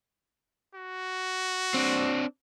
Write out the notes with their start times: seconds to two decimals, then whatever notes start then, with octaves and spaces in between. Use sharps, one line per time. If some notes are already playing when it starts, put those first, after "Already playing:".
0.75 F#4
1.74 C4 D4